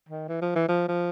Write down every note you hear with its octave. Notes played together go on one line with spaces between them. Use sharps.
D#3
E3
F3
E3
F3
F3